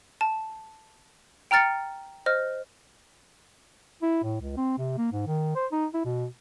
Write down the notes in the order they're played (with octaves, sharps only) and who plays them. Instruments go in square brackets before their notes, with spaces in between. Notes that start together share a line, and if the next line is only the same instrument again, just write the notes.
[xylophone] A5
G5 A#5 F6 A6 C#7
C5 D#5 F6
[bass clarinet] E4
A2
C#2
C4
C3
A#3
G#2
D#3
C5
D#4
E4
B2